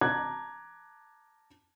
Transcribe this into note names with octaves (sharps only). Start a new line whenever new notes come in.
A5 A#5 D6 F#6 G#6